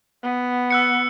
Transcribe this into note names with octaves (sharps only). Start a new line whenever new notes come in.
B3
E6 F#6 C#7